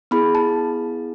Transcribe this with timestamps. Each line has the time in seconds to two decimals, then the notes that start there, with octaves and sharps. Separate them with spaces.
0.11 B3 E4 G#4 B5
0.35 A5